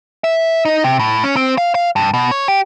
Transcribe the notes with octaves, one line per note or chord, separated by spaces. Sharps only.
E5
D#4
C3
A2
C#4
C4
F5
F5
G2
B2
C#5
G4